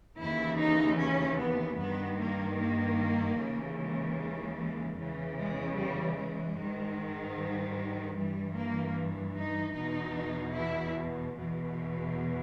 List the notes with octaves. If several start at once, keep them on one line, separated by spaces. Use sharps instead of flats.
D#2 C#3 E3 E4
D#4
C#4
B3
G2 D#3 B3
A#3
A#3
D#2 C#3 E3
G#3
G#3
G#3
E2 C#3 E3
G#3
G3
G#3
G#2 D#3
G3
G2 E3 G3
A#3
D#4
E2 B2 D#4
E4
E2 B2